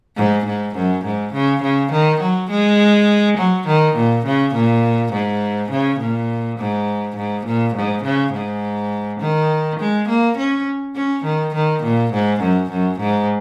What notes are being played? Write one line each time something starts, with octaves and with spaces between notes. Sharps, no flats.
G#2
G#2
F#2
G#2
C#3
C#3
D#3
F#3
G#3
F#3
D#3
A#2
C#3
A#2
G#2
C#3
A#2
G#2
G#2
A#2
G#2
C#3
G#2
D#3
G#3
A#3
C#4
C#4
D#3
D#3
A#2
G#2
F#2
F#2
G#2